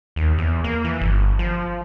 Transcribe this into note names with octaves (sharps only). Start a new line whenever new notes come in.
D#2
E2
A#3
E3
G1
F3